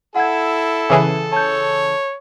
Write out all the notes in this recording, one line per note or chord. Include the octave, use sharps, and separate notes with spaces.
E4 A4 F#5 G#6
C#3 E3 G#4
C#5 A5 G6